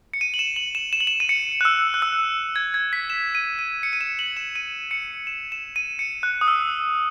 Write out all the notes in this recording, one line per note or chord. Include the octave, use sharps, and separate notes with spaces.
C#7
D#7
F#7
E7
F#7
E7
E7
F#7
E7
D#7
C#7
F#6
E6
F#6
E6
G#6
G#6
B6
E7
D#7
D#7
C#7
D#7
E7
F#7
E7
D#7
C#7
E7
E7
D#7
C#7
F#6
D#6
E6